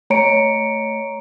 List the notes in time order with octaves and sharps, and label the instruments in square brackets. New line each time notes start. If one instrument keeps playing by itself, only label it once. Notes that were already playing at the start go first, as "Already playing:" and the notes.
[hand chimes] A3 C#5 A#5 C#7 D7